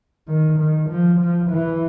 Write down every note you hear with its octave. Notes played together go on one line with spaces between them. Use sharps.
D#3
D#3
F3
F3
E3